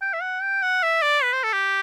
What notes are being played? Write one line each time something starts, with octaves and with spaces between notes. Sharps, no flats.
G5
E5
F#5
G5
F#5
E5
D5
B4
C5
A4
G4